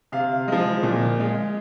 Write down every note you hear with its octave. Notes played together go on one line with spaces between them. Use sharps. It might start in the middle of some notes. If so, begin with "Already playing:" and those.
C3 F5
F3 G#3
A#2
G#3